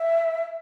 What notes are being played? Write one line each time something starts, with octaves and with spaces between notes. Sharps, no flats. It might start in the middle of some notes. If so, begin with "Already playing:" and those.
Already playing: E5